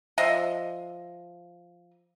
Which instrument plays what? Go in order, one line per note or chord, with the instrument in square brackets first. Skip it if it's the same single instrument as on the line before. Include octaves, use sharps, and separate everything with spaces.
[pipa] F3 D#5 E5